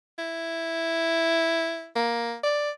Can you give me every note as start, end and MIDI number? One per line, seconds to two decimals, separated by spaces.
0.18 1.89 64
1.96 2.35 58
2.44 2.70 74